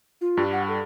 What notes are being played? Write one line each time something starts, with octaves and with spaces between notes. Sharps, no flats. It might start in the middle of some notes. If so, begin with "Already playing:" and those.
F4
G2 G3
F#5
A4